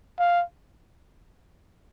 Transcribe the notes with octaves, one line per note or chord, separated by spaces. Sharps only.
F5